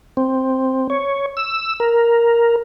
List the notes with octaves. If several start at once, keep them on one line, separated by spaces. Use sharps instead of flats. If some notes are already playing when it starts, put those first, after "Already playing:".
C4
C#5
E6
A#4